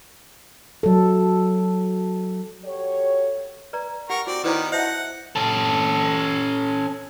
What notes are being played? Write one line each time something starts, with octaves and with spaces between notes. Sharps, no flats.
F#3 A4
F#4 G4 A4 C#5
B4 D5 A#5
G4 A#4 F#5 G5 C#6
C4 F#4 D5
D#3 B3 E4 B4 C5 D5 F5 A#5
C5 D#5 E5 F#5 A5 G6 A#6
C#4 A4